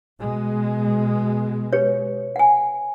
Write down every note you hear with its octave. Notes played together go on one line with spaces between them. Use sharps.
B2 G#3
G4 B4 C#5
F#5 G#5